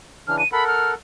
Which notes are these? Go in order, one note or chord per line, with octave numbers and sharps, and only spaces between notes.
C#3 E3 D4 F6
D#7
A4 A#4 F#5 B5
F6